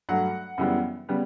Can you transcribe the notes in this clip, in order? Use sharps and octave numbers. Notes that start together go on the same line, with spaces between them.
G2 F#3 A3 F#5
F#2 C#3 E3 G3 B3
C#3 G3 B3